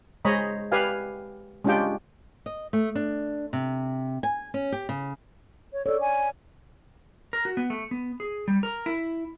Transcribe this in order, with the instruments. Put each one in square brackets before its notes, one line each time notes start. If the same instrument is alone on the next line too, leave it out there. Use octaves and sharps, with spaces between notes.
[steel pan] G#3 C5 C#5 D#5 A#5 B5
G4 B4 D5 F5 G#5
G#3 C#4 D4 F4 G4 G5
[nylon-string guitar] D#5
A3
D4
C3
G#5
C#4
G4
C#3
[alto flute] C#5
[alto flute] A4 [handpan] C#5 D5
[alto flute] G#5
[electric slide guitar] A#4
F#4
B3
A3
B3
G#4
G3
A#4
E4